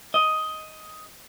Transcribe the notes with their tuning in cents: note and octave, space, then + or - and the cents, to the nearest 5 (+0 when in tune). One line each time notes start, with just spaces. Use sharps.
D#5 +10